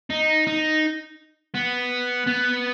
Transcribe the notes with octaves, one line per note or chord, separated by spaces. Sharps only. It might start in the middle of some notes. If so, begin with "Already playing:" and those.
D#4
D#4
B3
B3